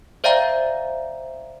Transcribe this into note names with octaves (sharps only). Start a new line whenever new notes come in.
C5 D5 E5 F5 G5 A#5